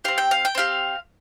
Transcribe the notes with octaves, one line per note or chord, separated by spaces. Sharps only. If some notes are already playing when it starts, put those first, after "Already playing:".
C4 G4 F5
G5
F5
G5
C4 G4 F5